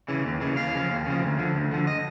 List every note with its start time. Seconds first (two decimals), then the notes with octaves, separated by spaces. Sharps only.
0.08 C#3 E3
0.24 D#2
0.41 C#3 E3
0.57 D#2 F5
0.74 C#3 F3
0.90 D#2
1.06 C#3 F3
1.22 D2
1.39 D3 F3
1.55 D2
1.71 D3 F3
1.87 D#5